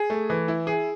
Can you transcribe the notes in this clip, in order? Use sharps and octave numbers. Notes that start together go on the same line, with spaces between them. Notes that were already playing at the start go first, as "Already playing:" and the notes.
Already playing: G#4
A3
E3
E4
G#4